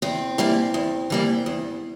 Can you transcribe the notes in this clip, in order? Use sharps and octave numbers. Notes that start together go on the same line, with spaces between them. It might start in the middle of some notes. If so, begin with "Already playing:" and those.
E2 C4
E3 G3 A#3
E2
E3 G3 A#3
E2